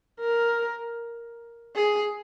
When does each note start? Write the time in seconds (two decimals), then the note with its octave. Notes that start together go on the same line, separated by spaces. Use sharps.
0.20 A#4
1.76 G#4